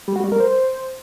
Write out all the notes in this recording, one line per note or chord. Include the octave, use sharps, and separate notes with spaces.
G3
F#4
G3
A#4
C5